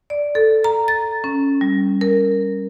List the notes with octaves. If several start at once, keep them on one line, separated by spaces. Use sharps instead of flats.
D5
A4
A#5
A6
C#4
G3
A#4